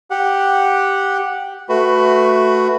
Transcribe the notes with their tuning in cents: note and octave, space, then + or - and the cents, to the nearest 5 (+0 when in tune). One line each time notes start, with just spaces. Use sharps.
G4 +0 F#5 -10
A3 +0 F#4 +0 B4 +15